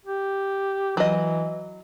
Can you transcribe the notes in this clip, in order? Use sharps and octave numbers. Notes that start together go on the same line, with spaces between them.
G4
E3 F#3 D#5